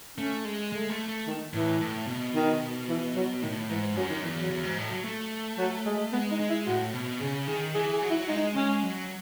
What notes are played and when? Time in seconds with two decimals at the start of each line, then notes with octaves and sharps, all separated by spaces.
0.18 A3 C#4
0.45 G#3
0.72 G#3 A3
0.90 A3
1.08 A3
1.27 D#3
1.54 A2 E3
1.81 A2
2.07 B2
2.35 D#3
2.89 E3
3.15 F#3
3.42 A2 D#3
3.69 G#2 E3
3.96 F#2 F#3
4.10 D#3
4.24 E2 E3
4.36 F#3
4.51 E2
4.64 G#2
4.78 A2
4.91 F#3
5.05 A3
5.58 F#3
5.85 G#3
6.13 G#3 B3
6.31 D#4
6.40 G#3
6.49 E4
6.66 A2 F#4
6.94 B2
7.20 C#3 G#4
7.47 D#3 G#4
7.75 E3 G#4
7.93 G#4
8.02 F#3
8.10 E4
8.28 G#3 D#4
8.55 G#3 C#4
8.83 F#3